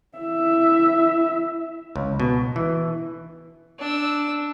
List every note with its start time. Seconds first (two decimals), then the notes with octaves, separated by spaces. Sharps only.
0.18 E4 E5
1.96 C#2
2.20 B2
2.56 E3
3.79 D4 E6